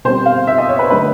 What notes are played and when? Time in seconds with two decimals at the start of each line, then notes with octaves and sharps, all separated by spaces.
0.05 B2 G3 C4 C5
0.26 F5
0.47 E5
0.58 D#5
0.69 C#5
0.79 B4
0.90 D3 F#3 A3 B4